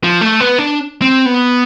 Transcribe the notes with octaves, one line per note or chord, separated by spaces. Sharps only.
F3
A3
B3
D4
C4
B3